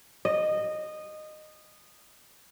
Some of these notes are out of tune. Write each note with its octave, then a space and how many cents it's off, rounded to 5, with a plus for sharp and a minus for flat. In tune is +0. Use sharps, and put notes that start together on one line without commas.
D#5 -15